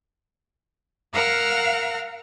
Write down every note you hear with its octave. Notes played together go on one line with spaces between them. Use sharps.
A#4 F5 F#5 A#5 E6 F6